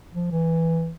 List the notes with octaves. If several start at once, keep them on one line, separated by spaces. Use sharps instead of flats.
F3
E3